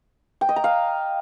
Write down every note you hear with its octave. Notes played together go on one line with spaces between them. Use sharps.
G5
D#5
A#5
F5